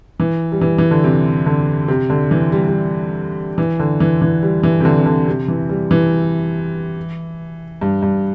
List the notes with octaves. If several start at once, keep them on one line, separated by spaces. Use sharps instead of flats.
E3
G3
E3
E3
D3
C3
D3
C3
D3
E3
G3
G3
E3
D3
E3
E3
G3
E3
C3
D3
C3
D3
C3
E3
G3
E3
G2
G2